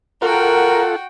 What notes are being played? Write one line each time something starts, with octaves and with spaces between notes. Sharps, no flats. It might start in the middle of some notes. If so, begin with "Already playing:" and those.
F4 F#4 A4 A#4 F#5 G5